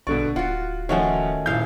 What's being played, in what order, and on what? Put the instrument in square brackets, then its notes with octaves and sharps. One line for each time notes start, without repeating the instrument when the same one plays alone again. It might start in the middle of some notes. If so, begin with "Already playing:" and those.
[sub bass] A#1 [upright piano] B2 D3 C#6 [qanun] D5
[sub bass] D1 [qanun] F4 F#4 [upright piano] F#5
[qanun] D#3 A3 C#4 [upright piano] F3 F#4 C#5
[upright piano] D#1 G6 [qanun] E4 F5